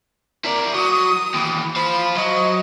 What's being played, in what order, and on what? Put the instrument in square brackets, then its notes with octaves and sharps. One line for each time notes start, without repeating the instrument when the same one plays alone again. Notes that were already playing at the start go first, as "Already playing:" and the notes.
[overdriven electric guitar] E4 D5 [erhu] A#4
[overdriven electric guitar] F#3 [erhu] D#6
[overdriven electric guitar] D#2 E3
[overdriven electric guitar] C5 F5 [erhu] B5
[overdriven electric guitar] F#3 [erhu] D#5